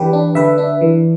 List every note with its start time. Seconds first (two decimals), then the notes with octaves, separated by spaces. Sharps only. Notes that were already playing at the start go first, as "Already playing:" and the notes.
Already playing: E3 D4 G4 B4
0.13 D4
0.35 D3 B4 E5
0.58 D4
0.81 E3